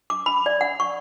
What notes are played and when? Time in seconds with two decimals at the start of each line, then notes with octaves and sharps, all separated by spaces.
0.10 D6
0.26 B5
0.46 D5
0.61 F#5
0.80 C#6